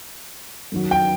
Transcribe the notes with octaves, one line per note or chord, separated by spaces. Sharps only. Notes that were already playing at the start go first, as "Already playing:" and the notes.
F#2 D#3 F#3
G5